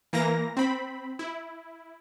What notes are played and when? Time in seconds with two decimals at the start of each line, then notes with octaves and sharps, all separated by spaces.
0.13 E3 A#3 A#5 A#6
0.57 C4 B5
1.19 E4